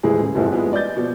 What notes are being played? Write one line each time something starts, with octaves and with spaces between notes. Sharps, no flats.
D#1 A2 E3 G#3 G#4
C#3
F#1 C2 G#2 E3 F3
E3 F3 G3 G#3 B3
D5 D#5 G6 A6
B2 F3